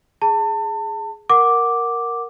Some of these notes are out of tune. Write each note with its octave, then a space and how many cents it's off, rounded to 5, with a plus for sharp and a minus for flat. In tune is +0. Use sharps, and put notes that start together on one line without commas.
G#4 +0 A5 +30
A#4 +0 F#5 -5 D6 +0